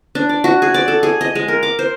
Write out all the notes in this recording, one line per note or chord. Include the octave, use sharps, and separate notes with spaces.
D4
D5
F#4
G#4
D5
A4
G#4
D#5
G#3
A#4
D6
C5